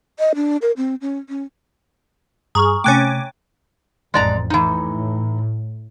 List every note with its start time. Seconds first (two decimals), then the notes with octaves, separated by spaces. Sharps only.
0.19 D#5
0.35 D4
0.62 A#4
0.77 C4
1.01 C#4
1.29 C#4
2.55 G2 G#4 A#5 C#6 F6
2.84 C3 A3 C#4 G5 G#5 D6 F#6 A6
4.14 A1 F2 G#3 D5 A#5
4.50 A2 E3 D#4